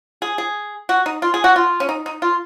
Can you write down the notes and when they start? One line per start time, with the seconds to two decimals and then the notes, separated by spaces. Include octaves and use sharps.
0.22 G#4
0.38 G#4
0.89 F#4
1.06 D#4
1.22 F4
1.34 G#4
1.44 F#4
1.56 F4
1.80 C#4
1.89 D#4
2.06 D#4
2.22 F4